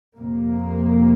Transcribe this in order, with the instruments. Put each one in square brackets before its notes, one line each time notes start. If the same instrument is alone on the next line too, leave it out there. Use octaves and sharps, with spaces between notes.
[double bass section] F2 C3 A#3